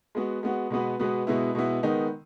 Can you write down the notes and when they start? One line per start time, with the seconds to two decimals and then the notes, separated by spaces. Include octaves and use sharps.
0.15 G#3 B3 F#4
0.43 G#3 B3 F#4
0.70 B2 G#3 B3 F#4 B4
1.00 B2 G#3 B3 F#4 B4
1.27 B2 G#3 B3 E4
1.55 B2 G#3 B3 E4
1.83 D#3 G#3 B3 D#4